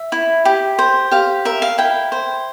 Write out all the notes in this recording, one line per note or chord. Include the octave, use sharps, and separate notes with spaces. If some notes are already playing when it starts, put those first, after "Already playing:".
Already playing: E5
E4
G4
C5
G4 F5
A#4 E5
F5
E4 G5
C5